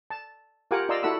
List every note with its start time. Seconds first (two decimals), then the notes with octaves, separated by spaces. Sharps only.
0.10 A5
0.71 F4 G4 A#4 F#5 G#5 D6
0.89 F4 D5 D#5 A#5 C6 E6
1.03 E4 F#4 A4 F#5 B5 E6